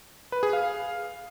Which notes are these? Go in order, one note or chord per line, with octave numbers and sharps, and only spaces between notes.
B4
G#4
F5